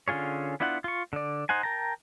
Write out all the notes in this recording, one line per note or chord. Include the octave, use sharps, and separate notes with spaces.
D3 C#4 F4 G#4 C#5
B3 D4 E4 F4 F#5
F4 C#6
D3 D5
D#4 C5 F#5 G#5
A#4 G5 A5 A#5